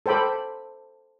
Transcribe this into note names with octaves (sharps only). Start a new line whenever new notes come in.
A4 C5 G5 B5 D6